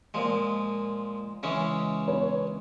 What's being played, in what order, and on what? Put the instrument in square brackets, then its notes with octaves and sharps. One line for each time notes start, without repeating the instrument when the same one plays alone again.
[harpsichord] A#2 F3 G#3
C#3 E3 G#3 C#4
[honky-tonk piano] B4 C#5